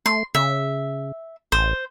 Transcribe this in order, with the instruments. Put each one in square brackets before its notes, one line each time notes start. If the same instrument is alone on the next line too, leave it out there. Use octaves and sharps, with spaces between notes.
[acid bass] A3 [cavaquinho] C6
[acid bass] C#3 [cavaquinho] E5
[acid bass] A1 [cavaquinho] C5